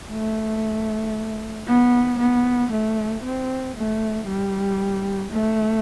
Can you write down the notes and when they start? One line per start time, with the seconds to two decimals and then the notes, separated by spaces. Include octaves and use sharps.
0.11 A3
1.67 B3
2.19 B3
2.71 A3
3.23 C4
3.76 A3
4.27 G3
5.32 A3